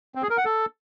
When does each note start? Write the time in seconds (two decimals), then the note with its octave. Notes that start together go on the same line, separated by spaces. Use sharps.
0.15 C4
0.23 G#4
0.30 A#4
0.38 F#5
0.45 A4